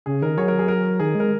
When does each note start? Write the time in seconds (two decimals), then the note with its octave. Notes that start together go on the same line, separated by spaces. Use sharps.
0.06 C#3 G#4
0.22 D#3 A#4
0.37 F#3 G#4 C#5
0.48 A#4
0.59 G#4
0.68 A#4
1.00 D#3 G#4
1.15 G#3 A#4